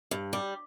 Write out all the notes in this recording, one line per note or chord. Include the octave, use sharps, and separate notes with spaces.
G2
G3